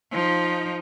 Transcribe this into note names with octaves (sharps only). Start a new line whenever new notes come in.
F3 D#4